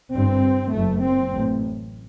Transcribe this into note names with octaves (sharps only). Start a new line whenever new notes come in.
G1 G2 C4
F#1 F#2 A3
C4
A1 A2